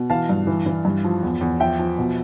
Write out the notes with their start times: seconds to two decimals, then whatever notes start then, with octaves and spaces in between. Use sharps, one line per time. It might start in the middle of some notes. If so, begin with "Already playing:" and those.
Already playing: B2
0.10 E3 F5 A5
0.29 G2
0.47 E3
0.66 E3
0.85 G2
1.04 F3
1.23 E2
1.41 E2
1.60 F3 E5 G5
1.79 F3
1.98 B2